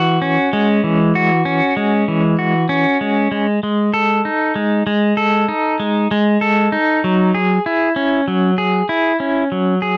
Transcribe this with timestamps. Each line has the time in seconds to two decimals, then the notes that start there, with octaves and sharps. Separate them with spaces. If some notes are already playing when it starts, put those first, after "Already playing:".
Already playing: E3 F#4
0.22 C#4
0.53 G#3
0.84 E3
1.15 F#4
1.45 C#4
1.77 G#3
2.08 E3
2.39 F#4
2.69 C#4
3.01 G#3
3.32 G#3
3.63 G#3
3.94 A4
4.25 D#4
4.56 G#3
4.87 G#3
5.17 A4
5.49 D#4
5.80 G#3
6.11 G#3
6.41 A4
6.72 D#4
7.04 F#3
7.34 G#4
7.66 E4
7.96 C#4
8.28 F#3
8.58 G#4
8.89 E4
9.20 C#4
9.52 F#3
9.82 G#4